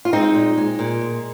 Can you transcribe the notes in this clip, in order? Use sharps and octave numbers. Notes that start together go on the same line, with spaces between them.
F4
G#3 C4 D#4
A#2
G#3
A#2
G#3